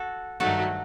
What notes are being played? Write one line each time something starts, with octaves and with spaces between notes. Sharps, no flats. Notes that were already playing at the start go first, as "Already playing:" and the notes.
Already playing: F#4 A4
G2 D#3 F#3 A3 D#4 F#4 A4